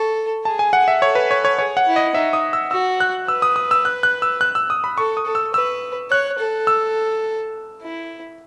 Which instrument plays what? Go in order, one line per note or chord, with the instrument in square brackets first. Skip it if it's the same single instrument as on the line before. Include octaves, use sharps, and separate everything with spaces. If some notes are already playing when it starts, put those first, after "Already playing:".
Already playing: [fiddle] A4 [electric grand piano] C#6
[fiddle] G#4 [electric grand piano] A5
[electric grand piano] G#5
F#5
E5
[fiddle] A4 [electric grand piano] C#5
[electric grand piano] B4
C#5
C#5
[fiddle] G#4 [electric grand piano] C#5
[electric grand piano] F#5
[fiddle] E4
[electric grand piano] D#5
[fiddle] D#4 [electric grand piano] E5
[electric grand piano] D#6
E6
[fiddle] F#4 [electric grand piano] E6
[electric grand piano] F#6
[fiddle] B4 [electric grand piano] E6
[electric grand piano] D#6
D#6
E6
F#6
F#6
E6
F#6
E6
D#6
B5
[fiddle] A4 [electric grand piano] C#6
[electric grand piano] D#6
[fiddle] A4
[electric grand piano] E6
[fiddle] B4 [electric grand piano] E6
[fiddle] C#5 [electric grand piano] F#6
[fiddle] A4
[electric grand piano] E6
[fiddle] E4